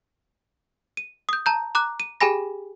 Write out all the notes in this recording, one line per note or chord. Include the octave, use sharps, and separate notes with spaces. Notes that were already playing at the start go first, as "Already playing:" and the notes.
D#7
D#6 G6
A5 A#5 G6
A#5 D6 F#6
D#7
G4 G#4 G5 G#5 B5 A#6